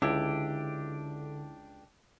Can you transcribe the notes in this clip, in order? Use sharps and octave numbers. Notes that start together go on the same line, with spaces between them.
C#2 D3 D4 E4 G4